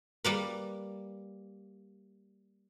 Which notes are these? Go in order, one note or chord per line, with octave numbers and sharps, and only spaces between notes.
G3 A#3 B4